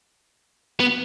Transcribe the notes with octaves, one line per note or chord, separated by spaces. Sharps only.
B3